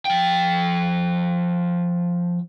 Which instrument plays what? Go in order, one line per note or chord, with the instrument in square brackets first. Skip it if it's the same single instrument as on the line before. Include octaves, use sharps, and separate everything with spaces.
[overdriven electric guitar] F3 G5